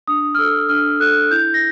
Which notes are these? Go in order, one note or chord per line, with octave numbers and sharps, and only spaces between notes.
D4 D#6
F6
A4 E6
D4 F6
A4 F#6
E4 G6
A#6